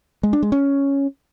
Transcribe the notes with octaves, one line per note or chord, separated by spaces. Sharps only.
G#3
D4
G#3
C#4